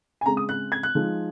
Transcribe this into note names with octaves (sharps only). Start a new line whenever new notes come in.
G#5
C#3 G#3 C4 A#5
D#6
F#6
G#6
F#6
F3 G#3 D#4